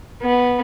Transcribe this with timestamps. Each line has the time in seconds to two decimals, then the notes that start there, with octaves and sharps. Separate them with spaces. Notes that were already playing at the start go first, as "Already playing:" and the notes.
0.22 B3